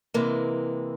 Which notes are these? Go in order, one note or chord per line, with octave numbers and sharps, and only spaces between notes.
C3 E3 G#3 A#3